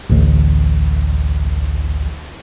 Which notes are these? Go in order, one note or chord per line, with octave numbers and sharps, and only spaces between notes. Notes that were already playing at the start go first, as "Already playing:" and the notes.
A1 D2